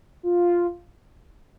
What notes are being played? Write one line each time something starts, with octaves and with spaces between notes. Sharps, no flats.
F4